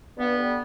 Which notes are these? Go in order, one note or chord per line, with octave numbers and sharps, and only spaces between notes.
G2 B3
D3 G3